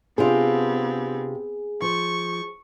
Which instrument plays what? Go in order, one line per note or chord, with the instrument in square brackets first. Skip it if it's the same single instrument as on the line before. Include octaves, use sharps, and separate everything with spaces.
[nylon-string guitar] C3 D4 F4 [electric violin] B3 C4 [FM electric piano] G#4
[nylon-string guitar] F3 [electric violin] C#6